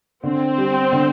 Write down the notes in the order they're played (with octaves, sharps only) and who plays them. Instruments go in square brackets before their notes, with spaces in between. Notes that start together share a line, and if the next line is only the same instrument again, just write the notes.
[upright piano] D3 [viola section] C4
[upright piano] G3
D3